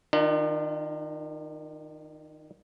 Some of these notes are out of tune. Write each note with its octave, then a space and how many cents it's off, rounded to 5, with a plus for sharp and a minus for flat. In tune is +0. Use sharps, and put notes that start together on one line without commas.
D#3 +0 D4 +45 F4 +0